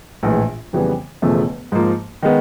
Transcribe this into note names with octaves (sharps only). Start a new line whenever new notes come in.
A#1 A2 E3 G#3
F2 C#3 E3 G3 B3
E1 E2 C#3 F3 A3
G#2 F3 A#3
D#3 G#3 B3